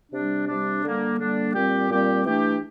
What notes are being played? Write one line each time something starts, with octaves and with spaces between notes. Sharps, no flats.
C3 G3 D4
C3 G3 D4
D3 G3 A#3 D4
D3 G3 A#3 D4
A#2 G3 C4 G4
A#2 G3 C4 G4
E3 A3 D4 G4